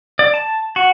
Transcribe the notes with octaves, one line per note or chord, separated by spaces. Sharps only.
D5
A5
F#4